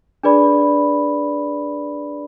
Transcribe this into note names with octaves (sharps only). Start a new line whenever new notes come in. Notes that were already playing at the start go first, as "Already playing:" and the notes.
D4 G#4 B4 D5 B5